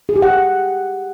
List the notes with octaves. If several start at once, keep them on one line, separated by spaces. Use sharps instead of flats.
G#4
G4
F#5